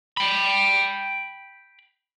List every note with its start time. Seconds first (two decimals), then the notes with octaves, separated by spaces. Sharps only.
0.17 G5 B5